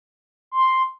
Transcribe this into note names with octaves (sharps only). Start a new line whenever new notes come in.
C6